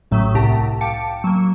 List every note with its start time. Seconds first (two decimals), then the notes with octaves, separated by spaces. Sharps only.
0.11 A1 A2 F#3 A3 D#6 B6
0.34 C2 A2 C3 G4 F#5 A5
0.81 F5 G5 A5 D6 C#7 D7
1.24 F#3 A#3